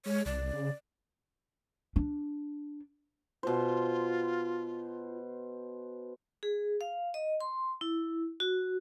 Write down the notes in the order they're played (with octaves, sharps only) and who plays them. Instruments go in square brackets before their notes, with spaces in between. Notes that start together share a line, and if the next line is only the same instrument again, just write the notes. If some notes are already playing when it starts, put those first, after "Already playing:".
[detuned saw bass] G#3 [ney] C#5
[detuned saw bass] C2 [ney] D5
[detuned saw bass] C#3
[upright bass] D4
[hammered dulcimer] B2 C5 [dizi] F4
[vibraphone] G#4
F5
D#5
C6
E4
F#4